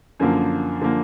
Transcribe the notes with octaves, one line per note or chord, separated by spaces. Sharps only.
F#2 D3 F3 A#3
D3 F3 A#3